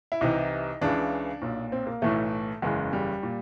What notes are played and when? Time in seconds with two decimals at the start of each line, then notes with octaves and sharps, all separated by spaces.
0.12 E4
0.21 C2 C3 E3 D#4
0.81 C#2 C#3 E3 D4
1.42 B1 A#2
1.72 C4
1.87 A#3
2.02 B1 A2 E3 A3
2.62 F#1 E2 C#3 G#3
2.93 G3
3.23 A#2